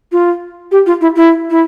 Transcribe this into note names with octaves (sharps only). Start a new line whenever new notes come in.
F4
G4
F4
E4
E4
E4